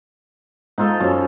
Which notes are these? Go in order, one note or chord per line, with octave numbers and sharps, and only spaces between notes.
G#2 D#4 F4 A4
F#2 F3 C#4